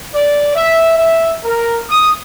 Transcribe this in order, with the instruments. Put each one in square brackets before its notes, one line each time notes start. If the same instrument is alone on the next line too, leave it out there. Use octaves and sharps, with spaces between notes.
[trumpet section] D5
E5
E5
A#4
D#6